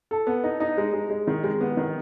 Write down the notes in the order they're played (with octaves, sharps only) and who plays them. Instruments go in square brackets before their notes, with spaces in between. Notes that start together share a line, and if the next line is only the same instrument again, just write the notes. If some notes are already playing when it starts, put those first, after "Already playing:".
[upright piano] A4
B3
D#4
D#4
G#3
G#3
G#3
D#3
G#3
B3
D#3